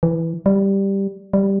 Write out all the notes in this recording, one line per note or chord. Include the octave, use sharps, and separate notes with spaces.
E3
G3
G3